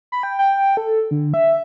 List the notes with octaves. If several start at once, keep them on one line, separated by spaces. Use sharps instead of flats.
B5
G5
G5
A4
D3
E5